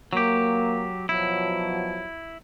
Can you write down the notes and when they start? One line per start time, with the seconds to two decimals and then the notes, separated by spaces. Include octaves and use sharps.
0.13 F#3 A#3 G4
1.09 B2 F3 F#3 E4